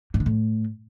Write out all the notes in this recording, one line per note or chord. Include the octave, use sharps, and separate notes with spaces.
G#2
D3
A2